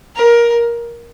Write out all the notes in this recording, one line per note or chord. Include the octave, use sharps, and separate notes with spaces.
A#4